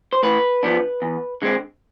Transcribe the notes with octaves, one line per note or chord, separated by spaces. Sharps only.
C5
A2 B4
F3 B3 D4
E2
D3 G#3 C4